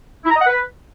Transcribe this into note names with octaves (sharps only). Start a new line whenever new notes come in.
E4
A#5
D#5
F#5
B4